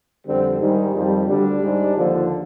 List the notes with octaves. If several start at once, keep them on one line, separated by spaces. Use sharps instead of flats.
F2 D3 G3 C4
G#2 D#3 G3
F2 D#3 G3
D2 D3 G3 D4
G#2 G3
D#2 D3 F3